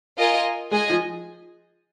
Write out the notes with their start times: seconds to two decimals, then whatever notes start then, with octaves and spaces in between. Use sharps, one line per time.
0.17 F4 A#4 D#5 G#5
0.71 G#3 G#4 D#5 G#5
0.90 F3